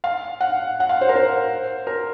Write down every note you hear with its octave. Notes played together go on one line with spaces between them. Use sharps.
F5
F#5
F#5
F5
C5
A#4
C5
A#4